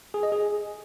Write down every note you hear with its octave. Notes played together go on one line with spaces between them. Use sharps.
G#4
D#5
G#4